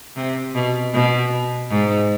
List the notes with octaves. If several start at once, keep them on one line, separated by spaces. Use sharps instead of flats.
C3
B2
B2
G#2